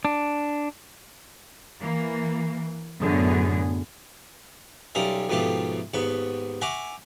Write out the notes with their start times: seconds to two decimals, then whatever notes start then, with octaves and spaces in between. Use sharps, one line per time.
0.05 D4
1.82 E3 A#3
3.03 F#2 A2 D3 B3 G#4
4.95 B1 G3 C#4 F4 A#4 E5
5.29 F2 G#2 B2 A3 F4 G4
5.94 D#2 G#2 B3 B4 C#6
6.61 E5 F#5 G#5 A#5 C#6 D6